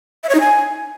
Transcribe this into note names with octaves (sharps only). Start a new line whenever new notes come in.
E5
C#5
D#4
G#5